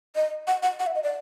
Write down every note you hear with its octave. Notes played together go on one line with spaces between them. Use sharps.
D#5
F#5
F#5
F#5
E5
D#5
D5